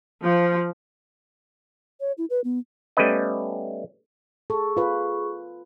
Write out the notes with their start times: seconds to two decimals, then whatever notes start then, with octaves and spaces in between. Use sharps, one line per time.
0.22 F3
2.00 C#5
2.18 E4
2.30 B4
2.44 B3
2.97 G3 A3 B3 C#4 B4 D#5
4.50 G#4 A4 C#6
4.77 F4 B4